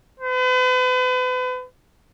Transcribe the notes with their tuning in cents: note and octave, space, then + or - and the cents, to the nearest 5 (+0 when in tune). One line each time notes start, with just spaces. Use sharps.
B4 +40